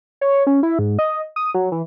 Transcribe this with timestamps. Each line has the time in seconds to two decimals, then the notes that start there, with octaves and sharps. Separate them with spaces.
0.21 C#5
0.47 C#4
0.63 E4
0.79 G#2
0.99 D#5
1.36 D#6
1.54 F#3
1.72 E3